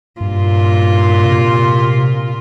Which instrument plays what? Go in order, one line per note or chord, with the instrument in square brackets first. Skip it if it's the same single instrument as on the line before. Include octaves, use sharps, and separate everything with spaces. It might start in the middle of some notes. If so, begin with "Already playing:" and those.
[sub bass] G2 [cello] A#2 F4
[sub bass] C3